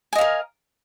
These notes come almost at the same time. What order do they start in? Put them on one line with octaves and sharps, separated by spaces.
G#5 D#5 F5 A#4